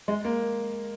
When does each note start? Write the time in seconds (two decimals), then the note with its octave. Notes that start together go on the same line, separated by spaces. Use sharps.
0.08 G#3
0.25 A#3